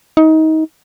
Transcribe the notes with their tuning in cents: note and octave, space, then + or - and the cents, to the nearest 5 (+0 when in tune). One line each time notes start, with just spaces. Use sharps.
D#4 +25